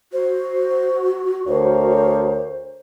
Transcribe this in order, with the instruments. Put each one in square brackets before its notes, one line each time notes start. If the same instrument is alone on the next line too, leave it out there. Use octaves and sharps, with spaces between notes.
[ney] F#4 [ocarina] C5
[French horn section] D2 A#4 C#5 [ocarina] C5